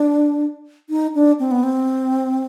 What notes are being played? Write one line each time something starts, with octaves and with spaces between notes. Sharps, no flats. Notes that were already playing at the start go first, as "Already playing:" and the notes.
Already playing: D4
D#4
D4
C4
B3
C4